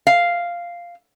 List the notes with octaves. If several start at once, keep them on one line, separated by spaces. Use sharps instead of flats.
F5